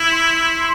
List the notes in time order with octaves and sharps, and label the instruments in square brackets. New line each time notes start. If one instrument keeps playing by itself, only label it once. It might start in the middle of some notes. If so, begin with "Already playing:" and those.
Already playing: [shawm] E4
[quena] C6